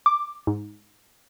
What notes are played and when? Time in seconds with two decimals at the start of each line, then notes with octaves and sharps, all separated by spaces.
0.06 D6
0.47 G#2